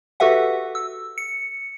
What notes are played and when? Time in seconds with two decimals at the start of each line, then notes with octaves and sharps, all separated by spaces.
0.20 F#4 G4 A4 B4 E5 F#5
0.75 E6
1.18 C#7